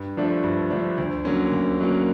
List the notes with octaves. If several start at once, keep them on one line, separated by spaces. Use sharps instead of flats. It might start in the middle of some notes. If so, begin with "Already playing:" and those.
Already playing: G2
D3 F3 A3 D4
G2
D3 F3 A3 D4
D2
D3 F#3 A#3 C#4
D2
D3 F#3 A#3 C#4